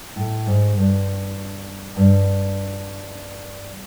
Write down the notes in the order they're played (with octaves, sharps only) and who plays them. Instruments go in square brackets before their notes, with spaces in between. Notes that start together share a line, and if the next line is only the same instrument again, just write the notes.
[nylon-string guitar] A2
G#2
G2
G2